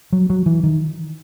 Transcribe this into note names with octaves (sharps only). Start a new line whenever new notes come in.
F#3
F#3
E3
D#3